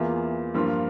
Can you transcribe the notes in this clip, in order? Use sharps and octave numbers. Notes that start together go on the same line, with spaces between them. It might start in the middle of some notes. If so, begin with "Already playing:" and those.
Already playing: E2 E3 A#3 F4
G2 F3 A#3 F4